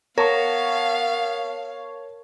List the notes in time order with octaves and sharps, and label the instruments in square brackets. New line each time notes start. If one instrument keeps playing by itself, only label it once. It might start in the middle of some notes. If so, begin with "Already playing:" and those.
[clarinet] B3 [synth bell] A#4 [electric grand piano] C#5 A5 C#6 [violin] F5